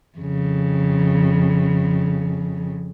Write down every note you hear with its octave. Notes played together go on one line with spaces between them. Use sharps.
F2 C#3